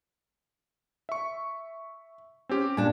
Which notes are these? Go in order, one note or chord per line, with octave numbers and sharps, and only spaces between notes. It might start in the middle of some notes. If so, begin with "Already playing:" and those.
E5 C#6
C4 C#4 G4
A#2 D4 G#5